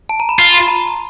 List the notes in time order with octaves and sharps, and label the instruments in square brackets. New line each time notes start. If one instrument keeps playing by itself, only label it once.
[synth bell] A5
A#5
B5
[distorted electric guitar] F4 [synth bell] C6
[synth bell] B5
A#5